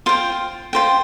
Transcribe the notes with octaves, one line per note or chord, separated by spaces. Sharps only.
F4 C5 G5
F4 C5 G5